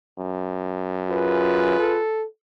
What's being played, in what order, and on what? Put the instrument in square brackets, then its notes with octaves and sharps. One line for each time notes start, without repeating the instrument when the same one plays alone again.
[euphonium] F#2
[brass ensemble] F4 G#4 B4
[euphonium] A4